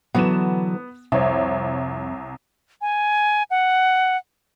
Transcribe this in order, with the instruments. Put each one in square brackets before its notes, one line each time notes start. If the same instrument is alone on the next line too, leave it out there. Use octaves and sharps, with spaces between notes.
[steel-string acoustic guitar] D3 E3 F#3 [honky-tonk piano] B3 E7
[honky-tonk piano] C2 C#5 [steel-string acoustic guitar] F2
[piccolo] G#5
F#5